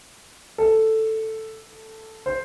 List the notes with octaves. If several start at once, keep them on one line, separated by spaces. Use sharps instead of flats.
A4
C5